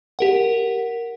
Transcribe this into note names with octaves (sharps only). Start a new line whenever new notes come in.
G4 A#4 F#5